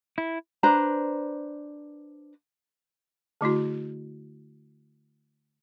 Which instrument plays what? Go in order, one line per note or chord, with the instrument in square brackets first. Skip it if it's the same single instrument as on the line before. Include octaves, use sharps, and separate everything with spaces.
[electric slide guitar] E4
[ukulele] D4 B4 C5 A#5
[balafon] D3 A3 E4 F#4